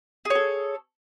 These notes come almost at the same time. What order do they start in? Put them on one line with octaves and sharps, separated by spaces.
G#4 C#5 A4